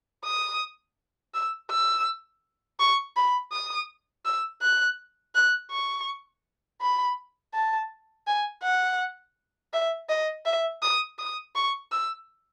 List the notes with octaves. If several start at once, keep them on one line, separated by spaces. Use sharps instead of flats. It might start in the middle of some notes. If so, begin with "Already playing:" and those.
D#6
E6
E6
C#6
B5
D#6
E6
F#6
F#6
C#6
B5
A5
G#5
F#5
E5
D#5
E5
D#6
D#6
C#6
E6